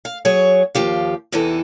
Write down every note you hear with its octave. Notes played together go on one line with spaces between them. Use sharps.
F5
F#3 G#4 C#5
D#2 F3 G4 F5
E2 C3 E3 D#4 A4